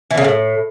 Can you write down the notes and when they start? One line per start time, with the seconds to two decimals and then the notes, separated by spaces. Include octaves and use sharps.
0.11 E3
0.18 C#3
0.24 A2